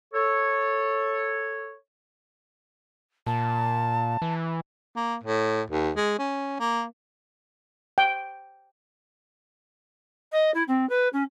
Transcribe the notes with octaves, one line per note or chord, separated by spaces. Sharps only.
A4 C#5
A#2 A5
E3
A#3
A2
D#2
G#3
C#4
A#3
G5
D#5
E4
C4
B4
C#4